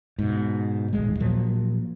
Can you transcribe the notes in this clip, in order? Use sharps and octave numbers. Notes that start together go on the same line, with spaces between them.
G#2 B2
D#1 A1 G#3
A#2 F3 F#3 A#3